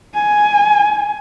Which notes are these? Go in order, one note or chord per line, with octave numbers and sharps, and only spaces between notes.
G#5